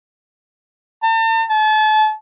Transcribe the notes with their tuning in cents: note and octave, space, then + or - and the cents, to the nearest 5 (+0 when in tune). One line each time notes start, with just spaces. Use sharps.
A5 +40
A5 -35